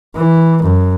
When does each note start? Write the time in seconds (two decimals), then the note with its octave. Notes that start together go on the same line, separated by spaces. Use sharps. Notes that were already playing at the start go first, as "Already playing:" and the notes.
0.16 E3
0.63 F#2